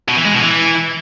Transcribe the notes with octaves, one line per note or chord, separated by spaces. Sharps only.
B2
E3
G#3
B2
E3